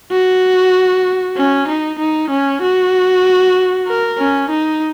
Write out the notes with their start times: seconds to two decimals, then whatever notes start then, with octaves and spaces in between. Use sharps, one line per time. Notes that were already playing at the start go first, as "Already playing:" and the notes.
0.11 F#4
1.37 C#4
1.68 D#4
1.99 D#4
2.30 C#4
2.62 F#4
3.87 A#4
4.18 C#4
4.50 D#4